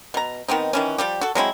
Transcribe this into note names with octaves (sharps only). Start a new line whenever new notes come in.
B2 A#5
D#3 B3 C4 D#4
D#3 E3 C#4
F3 G3 G4
F#4 A4
F#3 G#3 C4 E4